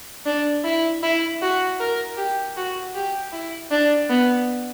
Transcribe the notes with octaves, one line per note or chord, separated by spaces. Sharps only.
D4
E4
E4
F#4
A#4
G4
F#4
G4
E4
D4
B3